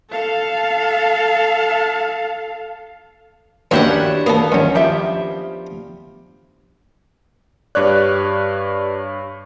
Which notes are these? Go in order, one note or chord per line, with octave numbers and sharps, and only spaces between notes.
A4 F5
D#2 A#3 C#4 D4 E4 F#4 G4 F#5
A#3 B3 A4
D#2 F3 F#3 C#4
F3 G4 E5
G2 G4 B4 C#5 D5 F#6